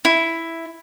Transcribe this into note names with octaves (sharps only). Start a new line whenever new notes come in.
E4